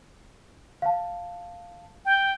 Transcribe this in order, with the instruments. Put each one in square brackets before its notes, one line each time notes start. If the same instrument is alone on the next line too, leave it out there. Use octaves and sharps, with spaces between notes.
[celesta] F5 A5
[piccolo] G5